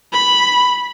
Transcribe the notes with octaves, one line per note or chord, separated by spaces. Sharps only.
B5